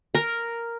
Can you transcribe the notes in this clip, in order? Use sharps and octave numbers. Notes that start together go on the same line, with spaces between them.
A#4